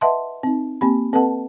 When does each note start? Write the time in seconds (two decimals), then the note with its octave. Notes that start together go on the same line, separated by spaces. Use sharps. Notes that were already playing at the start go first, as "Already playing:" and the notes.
0.01 B4 D#5 E5 F#5 A5 C6
0.43 C4 D#4
0.81 A#3 C4 G4 B5
1.13 C4 A4 B4 D#5 F#5 A5